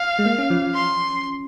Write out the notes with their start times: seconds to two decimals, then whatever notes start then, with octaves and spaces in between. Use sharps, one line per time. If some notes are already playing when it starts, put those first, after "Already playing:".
Already playing: F5
0.19 G#3
0.25 A#3
0.38 C#4
0.50 F3
0.62 F3
0.74 C6